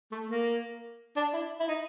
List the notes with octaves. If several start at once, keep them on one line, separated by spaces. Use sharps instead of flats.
A3
A#3
D4
E4
E4
D#4